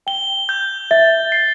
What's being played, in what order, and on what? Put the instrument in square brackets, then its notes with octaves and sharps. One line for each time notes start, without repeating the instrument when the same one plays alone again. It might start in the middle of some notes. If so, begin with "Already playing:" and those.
[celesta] G5 [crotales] G7
[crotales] G6
[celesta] E5 [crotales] A6
[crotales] C7